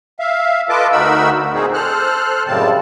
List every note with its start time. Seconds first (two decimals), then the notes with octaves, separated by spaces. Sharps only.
0.19 E5 F5
0.69 F4 A4 B4 D#5 A5 D6
0.92 D2 D#4 F#4 A#4 B5 E6
1.54 A#2 C4 D#4 G#4
1.74 A4 C5 F6 F#6
2.47 F#2 A2 C#3 G3 C4 A5